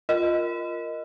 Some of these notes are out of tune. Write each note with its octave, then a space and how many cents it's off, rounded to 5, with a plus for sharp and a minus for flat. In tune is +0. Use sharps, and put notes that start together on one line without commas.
F4 +0 A#4 +0 D#5 +0